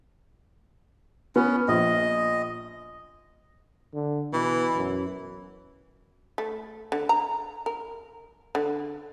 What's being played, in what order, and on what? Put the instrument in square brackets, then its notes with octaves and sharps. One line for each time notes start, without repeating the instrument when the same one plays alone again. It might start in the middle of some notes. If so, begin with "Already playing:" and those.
[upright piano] B3 [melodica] C#4
[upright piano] A#1 [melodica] D#5
[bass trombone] D3
[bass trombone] B2 [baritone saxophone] E3
[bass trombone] F#2
[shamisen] A3
D3
A#5
A#4
D3